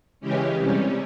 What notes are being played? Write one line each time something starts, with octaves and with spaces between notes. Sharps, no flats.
C#3 E3 G#3 C#4 G4
C3 G3 C#4